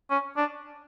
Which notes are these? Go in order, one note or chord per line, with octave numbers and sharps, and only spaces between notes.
C#4
D4